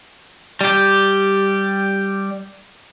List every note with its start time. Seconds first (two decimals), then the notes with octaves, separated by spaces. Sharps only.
0.61 G3 G4